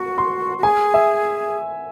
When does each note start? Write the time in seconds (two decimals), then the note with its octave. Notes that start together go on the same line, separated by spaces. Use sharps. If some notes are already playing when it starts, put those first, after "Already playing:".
Already playing: F#4 C#6
0.18 C6
0.58 F#4
0.63 G#4 G#5
0.94 E5